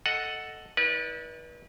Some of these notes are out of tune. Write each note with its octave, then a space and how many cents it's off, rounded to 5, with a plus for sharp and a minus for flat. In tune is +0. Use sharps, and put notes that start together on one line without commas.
A4 +0 D#5 +0 F#5 +0
E4 -45 B4 -35 D5 +0